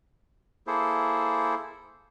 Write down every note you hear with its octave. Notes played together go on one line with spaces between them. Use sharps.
A#3 E4 G#4 A4 C5